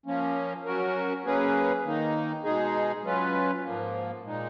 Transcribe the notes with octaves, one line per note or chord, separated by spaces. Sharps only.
F3 A#3 C#4
F#3 C#4 F#4 A#4
F#3 A#3 C#4 G#4 B4
D#3 A#3 D#4
B2 G#3 D#4 G#4
F#3 C#4 F4 B4
G#2 F3 A#3
A#2 G#3 D#4